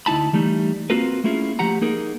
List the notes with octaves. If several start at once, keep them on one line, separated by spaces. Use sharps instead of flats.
D2 D#4 E4 A5 B5
E3 G3 A3 D#4
A#3 C4 F4 F#4 A#4 B4
A3 A#3 C#4 E4 F4 G#4
F3 A3 G4 F#5 A#5
A#3 D#4 G#4 A#4